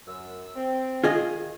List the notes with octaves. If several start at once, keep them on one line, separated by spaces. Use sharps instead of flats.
F#2 E6
C4
D#3 F4 G#4 D#5